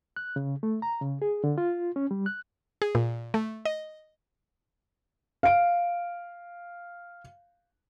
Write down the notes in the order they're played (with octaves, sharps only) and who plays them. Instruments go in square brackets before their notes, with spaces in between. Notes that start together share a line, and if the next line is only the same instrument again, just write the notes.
[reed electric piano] F#6
C#3
A3
A#5
C#3
G#4
D3
F4
C#4
G3
F#6
[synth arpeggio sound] G#4
A#2
A3
D#5
[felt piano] F5 D7